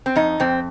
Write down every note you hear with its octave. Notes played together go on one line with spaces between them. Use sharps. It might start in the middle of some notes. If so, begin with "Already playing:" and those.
C4
F2 D#4
F2 C4